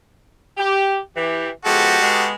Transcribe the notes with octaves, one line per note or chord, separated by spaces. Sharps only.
G4
E3 G4
F3 G#3 B3 F#4 G4 A4
G#3 B3